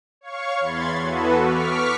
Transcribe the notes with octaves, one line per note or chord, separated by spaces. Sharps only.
C#5 F5 C#6
E2 B5 C6 G#6 A6
E3 B3 F#4 A4 B4
C#6 D6 F6 B6